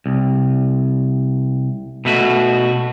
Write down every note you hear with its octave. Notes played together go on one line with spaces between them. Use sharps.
C2
B2 A3 F#4